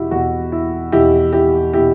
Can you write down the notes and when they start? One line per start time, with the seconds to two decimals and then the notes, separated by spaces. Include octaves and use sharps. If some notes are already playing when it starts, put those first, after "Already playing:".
Already playing: E2 B2 E4 F#4 G4
0.11 E2 B2 F#4
0.52 E4
0.92 E2 B2 E4 G4
1.33 E4 G4
1.73 B2 E4 G4